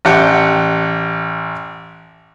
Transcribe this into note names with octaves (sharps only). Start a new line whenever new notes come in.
A1 G4 F#5 G5